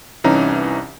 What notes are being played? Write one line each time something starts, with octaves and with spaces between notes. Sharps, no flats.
C2 E3 C#4 D#4 A#5